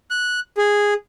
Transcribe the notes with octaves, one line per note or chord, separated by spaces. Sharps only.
F#6
G#4